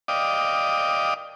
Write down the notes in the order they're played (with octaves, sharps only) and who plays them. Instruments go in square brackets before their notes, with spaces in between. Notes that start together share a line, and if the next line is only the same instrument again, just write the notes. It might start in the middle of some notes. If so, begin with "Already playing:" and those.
[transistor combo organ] D5 D#5 F5 G5 D6 D#6